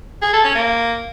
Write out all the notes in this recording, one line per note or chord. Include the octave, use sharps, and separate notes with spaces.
G#4
A4
C#4
A#3